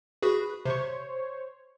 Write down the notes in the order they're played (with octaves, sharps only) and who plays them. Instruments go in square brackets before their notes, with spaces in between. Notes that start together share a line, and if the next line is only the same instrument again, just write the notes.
[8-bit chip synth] F#4 G#4 [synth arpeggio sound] B4
[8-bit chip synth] C3 [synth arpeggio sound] C5 C#5